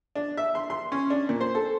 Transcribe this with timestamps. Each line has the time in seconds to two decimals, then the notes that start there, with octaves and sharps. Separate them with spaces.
0.15 D4
0.37 E5
0.55 C6
0.70 C6
0.92 C#4
1.10 D4
1.29 A#2
1.41 C5
1.55 A4